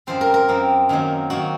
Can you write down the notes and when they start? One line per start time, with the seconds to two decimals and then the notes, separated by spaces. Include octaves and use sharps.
0.07 F#2 F3 C4 C5
0.21 A#4
0.34 A#4
0.48 F#2 F3 C4
0.89 F#2 D#3 F#3 A#3
1.30 D#3 F#3 A#3 F#4